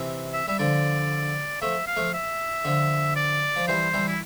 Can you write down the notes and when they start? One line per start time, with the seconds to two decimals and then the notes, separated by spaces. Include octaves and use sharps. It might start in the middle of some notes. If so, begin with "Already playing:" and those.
Already playing: C3 E3
0.33 E5
0.48 G3 E5
0.59 D3 F3 D5
1.62 F3 A3 E5
1.87 F5
1.96 F3 A3
2.14 E5
2.65 D3 F3
3.16 D5
3.56 F3
3.68 E3 G3 C5
3.94 E3 G3
4.08 E4